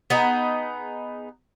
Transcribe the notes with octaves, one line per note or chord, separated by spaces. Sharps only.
B3 D#4 G#4